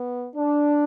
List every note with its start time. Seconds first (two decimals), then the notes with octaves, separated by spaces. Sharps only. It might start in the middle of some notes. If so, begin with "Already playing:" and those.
Already playing: B3
0.36 D4